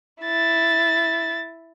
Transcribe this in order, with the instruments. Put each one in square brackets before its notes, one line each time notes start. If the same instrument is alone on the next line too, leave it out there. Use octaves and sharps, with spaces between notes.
[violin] E4 A6